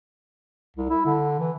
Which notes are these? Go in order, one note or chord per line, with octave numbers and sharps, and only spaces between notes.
C2
E4
D3
E3